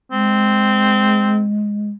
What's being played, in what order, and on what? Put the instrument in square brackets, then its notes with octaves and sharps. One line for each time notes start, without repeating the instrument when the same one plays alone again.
[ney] G#3 [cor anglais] C4